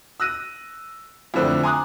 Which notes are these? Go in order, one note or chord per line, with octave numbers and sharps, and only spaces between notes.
E6 F#6 A#6 D#7
F2 A2 D3 C4 D4
G#5 A#5 C6 D6 D#6 F#6